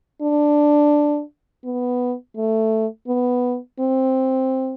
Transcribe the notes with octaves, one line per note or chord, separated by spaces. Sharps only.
D4
B3
A3
B3
C4